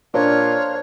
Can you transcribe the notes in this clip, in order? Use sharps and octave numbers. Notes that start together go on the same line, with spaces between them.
A#2 D4 C5 C#5 F5